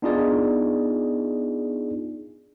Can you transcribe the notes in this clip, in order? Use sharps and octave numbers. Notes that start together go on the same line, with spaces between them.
B3 D4 D#4 F4 G#4 D5